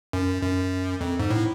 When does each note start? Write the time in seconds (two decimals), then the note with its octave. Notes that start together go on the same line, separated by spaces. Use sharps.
0.13 F#2
0.42 F#2
1.01 F2
1.19 G#2
1.30 A2